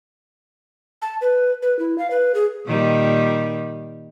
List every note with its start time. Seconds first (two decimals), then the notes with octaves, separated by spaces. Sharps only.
1.02 A5
1.21 B4
1.62 B4
1.79 E4
1.98 F5
2.11 B4
2.35 G#4
2.66 A#2 D#3 G3